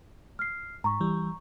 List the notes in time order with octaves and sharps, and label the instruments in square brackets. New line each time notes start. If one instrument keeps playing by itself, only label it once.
[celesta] F6 C7
[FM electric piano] G#2 [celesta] A#5 C#6
[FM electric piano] E3 G3